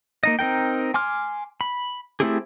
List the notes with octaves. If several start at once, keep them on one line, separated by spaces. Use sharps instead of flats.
A#3 D#4 D#5
C4 D#4 A#4 G5
G#5 C6 D6 F6
B5
A3 C4 E4 G4 G#4